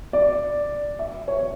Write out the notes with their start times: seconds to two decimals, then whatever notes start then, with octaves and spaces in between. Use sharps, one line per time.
0.13 D5
0.99 E5
1.28 C#5